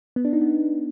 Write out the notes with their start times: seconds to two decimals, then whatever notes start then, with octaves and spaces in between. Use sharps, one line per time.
0.16 B3
0.25 D4
0.33 D#4
0.41 B3